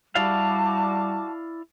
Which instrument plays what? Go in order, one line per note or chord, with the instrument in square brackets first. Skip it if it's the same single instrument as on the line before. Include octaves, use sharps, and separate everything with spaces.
[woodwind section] G3 [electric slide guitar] E4 D5 F5 [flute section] F#4 A5 D6